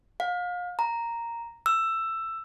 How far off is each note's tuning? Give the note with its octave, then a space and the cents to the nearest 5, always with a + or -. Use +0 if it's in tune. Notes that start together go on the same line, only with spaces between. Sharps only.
F5 +30
A#5 -5
E6 +15